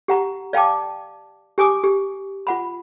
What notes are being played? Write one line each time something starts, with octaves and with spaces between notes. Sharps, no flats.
G4 F#5 A#5
D5 F5 G5 A5 D6
G4 G#5 D6 D#6
G4
F4 F#5 B5